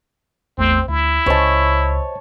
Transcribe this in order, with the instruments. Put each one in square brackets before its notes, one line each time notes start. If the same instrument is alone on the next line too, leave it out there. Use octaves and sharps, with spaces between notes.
[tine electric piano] A1 E2 A3 [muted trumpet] C4
[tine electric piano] D2 [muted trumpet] E4
[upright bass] C#2 [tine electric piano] C5 D#5 [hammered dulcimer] C#5 A5